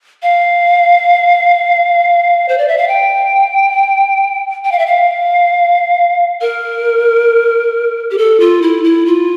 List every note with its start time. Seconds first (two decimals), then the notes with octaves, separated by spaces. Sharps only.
0.23 F5
2.49 C5
2.58 D5
2.68 E5
2.78 F5
2.88 G5
4.65 G5
4.72 F5
4.79 E5
4.87 F5
6.41 A#4
8.11 G4
8.18 A4
8.40 F4
8.62 E4
8.84 E4
9.06 F4